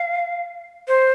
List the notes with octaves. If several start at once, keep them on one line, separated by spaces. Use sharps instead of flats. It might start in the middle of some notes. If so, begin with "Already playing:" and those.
Already playing: F5
C5